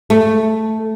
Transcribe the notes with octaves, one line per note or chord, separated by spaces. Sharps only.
A3